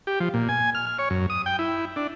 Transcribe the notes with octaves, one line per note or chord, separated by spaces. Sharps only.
G4
F3
A#2
G#5
F6
F6
C#5
F#2
D#6
G5
E4
D4